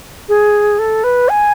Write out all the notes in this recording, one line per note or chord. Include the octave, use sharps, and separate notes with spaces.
G#4
A4
B4
G#5